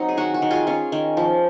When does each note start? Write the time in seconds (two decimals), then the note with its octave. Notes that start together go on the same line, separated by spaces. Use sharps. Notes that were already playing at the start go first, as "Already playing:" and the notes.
Already playing: F#3 C4 D#4
0.09 G#4
0.17 D#3 F#4
0.34 F#4
0.42 D#3
0.51 F4 G#4
0.67 C#4 F4
0.92 D#3
1.17 F3